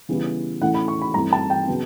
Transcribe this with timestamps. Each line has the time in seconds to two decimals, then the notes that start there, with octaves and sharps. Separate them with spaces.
0.09 C#3 E3 G3 B3 E4
0.61 A2 E3 A3 C#4 E4 F#5
0.74 B5
0.88 C#6
1.02 B5
1.14 G2 E3 A3 C4 E4 A#5
1.33 A5
1.50 G5
1.67 C#3 F#3 B3